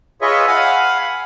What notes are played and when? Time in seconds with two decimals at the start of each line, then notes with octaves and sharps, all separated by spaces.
0.22 F4 G#4 B4 C#5 D#5 E5
0.47 F5 F#5 G#5 B5